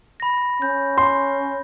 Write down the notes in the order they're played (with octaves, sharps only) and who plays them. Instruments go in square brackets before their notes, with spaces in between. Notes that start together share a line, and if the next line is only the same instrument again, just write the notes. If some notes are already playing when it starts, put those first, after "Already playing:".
[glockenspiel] B5 A#6
[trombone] C#4 [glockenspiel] G6
[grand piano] C6